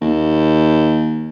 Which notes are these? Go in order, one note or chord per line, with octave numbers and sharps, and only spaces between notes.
D#2